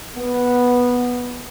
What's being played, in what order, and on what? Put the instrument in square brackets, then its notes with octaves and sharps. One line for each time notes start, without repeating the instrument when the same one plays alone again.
[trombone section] B3